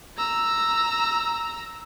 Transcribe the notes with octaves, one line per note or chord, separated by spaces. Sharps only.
A#5 E6